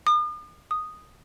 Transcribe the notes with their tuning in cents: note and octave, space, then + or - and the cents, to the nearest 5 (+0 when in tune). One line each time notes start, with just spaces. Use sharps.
D#6 -45
D#6 -5